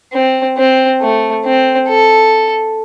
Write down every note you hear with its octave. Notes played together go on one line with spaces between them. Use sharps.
C4
C4
A3
C4
A4